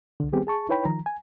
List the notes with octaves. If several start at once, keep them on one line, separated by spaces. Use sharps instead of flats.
C2 D3
D#3 G3 B3 C4 G4 G#4
G#4 A5 C#6
D#4 E4 B4 C#5 G5 B5
D#3 F3 A#5
G#5